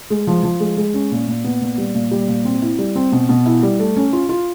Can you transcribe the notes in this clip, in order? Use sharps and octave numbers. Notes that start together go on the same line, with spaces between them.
G#3
F3
F3
G#3
G#3
C#4
A#2
A#2
B3
A#2
G3
A#2
G3
A#2
C4
E4
G3
C4
B2
B2
E4
G3
A3
C#4
F4
F4